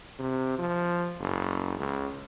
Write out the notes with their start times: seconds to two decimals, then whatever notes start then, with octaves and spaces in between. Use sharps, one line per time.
0.19 C3
0.59 F3
1.20 F#1
1.79 C#2